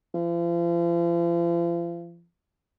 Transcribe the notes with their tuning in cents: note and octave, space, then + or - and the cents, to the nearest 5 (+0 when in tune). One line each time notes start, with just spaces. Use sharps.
F3 -40